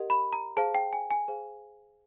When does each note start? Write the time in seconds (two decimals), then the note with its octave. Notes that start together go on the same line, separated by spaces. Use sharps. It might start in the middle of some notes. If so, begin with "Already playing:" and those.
Already playing: G4 A#4 D#5 F#5
0.10 B5
0.33 A#5
0.57 G#4 C5 F5 A5
0.75 G5
0.93 G#5
1.11 G#5
1.28 G#4 C5 F5